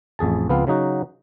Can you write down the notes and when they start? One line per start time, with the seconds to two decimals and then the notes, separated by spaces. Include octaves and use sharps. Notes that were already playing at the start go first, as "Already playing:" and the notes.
0.19 A1 F2 G#4 A5
0.49 C#2 F3 B3 C4 F5
0.67 C#3 F#3 D#4 F#4